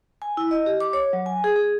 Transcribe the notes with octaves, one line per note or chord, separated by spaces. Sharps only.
G#5
E4
D#5
G4
D6
C#5
F#3
G#5
G#4
G#4